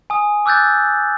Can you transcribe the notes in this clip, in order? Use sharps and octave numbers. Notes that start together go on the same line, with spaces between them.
G#5 D#6
D6 E6 F#6 G6 A6